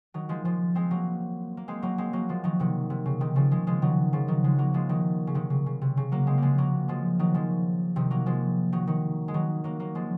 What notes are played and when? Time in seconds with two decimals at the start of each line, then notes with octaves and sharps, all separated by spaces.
0.14 D#3 F#3
0.29 F3 G#3
0.45 F3 G#3
0.75 G#3 C4
0.91 F#3 A#3
1.57 A#3
1.68 G#3 C4
1.82 F#3 A#3
1.98 G#3 C4
2.13 F#3 A#3
2.29 F3 G#3
2.44 D#3 F#3
2.60 C3 D#3
2.90 C3
3.06 C#3
3.20 C3 D#3
3.36 C#3 F3
3.51 F3 G#3
3.67 F3 G#3
3.82 D#3 F#3
4.13 C#3 F3
4.28 D#3 F#3
4.44 F3 G#3
4.58 F#3 A#3
4.74 F3 G#3
4.89 D#3 F#3
5.27 C#3
5.35 C3 D#3
5.50 C#3
5.66 C#3
5.82 C3
5.97 C#3
6.12 F#3 A#3
6.27 G#3 C4
6.38 F3 G#3 A#3
6.58 F#3 A#3
6.88 F3 G#3
7.19 D#3 F#3
7.34 F3 G#3
7.96 C3 D#3
8.11 F#3 A#3
8.26 F3 G#3
8.72 D#3 F#3
8.87 D#3 F#3
9.28 G#3
9.34 D#3 F#3
9.64 F#3 A#3
9.80 F#3 A#3
9.95 F3 G#3